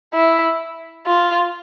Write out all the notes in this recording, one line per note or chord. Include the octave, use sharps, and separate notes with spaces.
E4
F4